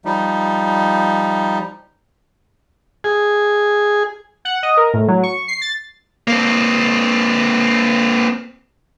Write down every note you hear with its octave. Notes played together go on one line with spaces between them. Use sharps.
F3 G3 D#4
G#4
F#5
D#5
A#4
A2
F#3
C#6
C7
A6
A#3 C4